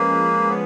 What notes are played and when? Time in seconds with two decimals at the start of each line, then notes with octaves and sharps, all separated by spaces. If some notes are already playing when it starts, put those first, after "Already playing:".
Already playing: F3 G#3 A#3 C#4 G#4 B4
0.50 B3